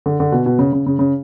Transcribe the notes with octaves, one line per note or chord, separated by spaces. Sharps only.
D3
D3
B2
B2
C#3
C#3
C#3
C#3